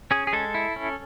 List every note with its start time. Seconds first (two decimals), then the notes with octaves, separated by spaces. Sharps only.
0.11 C#4 G#4
0.27 G#4
0.33 G#3 A4
0.54 E4
0.76 C#4